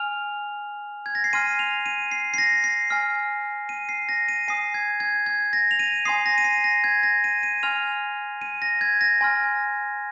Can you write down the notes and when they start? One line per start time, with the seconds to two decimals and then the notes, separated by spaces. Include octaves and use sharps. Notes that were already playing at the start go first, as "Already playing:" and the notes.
Already playing: G#5 F6 F7
1.06 G#6
1.15 A#6
1.24 C7
1.33 G#5 C6 F6 D#7
1.59 F7
1.86 D#7
2.11 C7
2.34 C7
2.38 A#6
2.64 C7
2.90 G#5 F6
3.69 D#7
3.89 C7
4.09 A#6
4.28 D#7
4.48 G#5 D#6 C7
4.74 G#6
5.00 G#6
5.26 G#6
5.53 A#6
5.71 F7
5.79 D#7
6.05 G#5 C6 D#6 C7
6.26 A#6
6.38 D#7
6.44 C7
6.64 A#6
6.84 G#6
7.03 A#6
7.24 D#7
7.43 D#7
7.63 G#5 C6 F6 F7
8.41 D#7
8.62 A#6
8.81 G#6
9.01 A#6
9.21 G#5 C6 F6